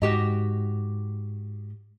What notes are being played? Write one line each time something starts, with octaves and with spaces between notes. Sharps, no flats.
G#2 F#4 G4 D#5